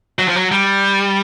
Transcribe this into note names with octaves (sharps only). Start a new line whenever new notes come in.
F#3
F3
F#3
G3